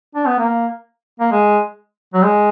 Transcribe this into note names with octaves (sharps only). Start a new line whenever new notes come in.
D4
B3
A#3
A#3
G#3
F#3
G#3